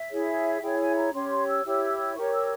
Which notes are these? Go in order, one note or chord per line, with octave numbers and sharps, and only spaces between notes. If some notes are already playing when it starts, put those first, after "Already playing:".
Already playing: E5
E4 G#4 C#5
E4 G#4 C#5 G5
G#5
A#5
C#4 G4 C#5 C6
C6
E6
E4 G4 C#5
G4 A#4 C#5 C#6
E6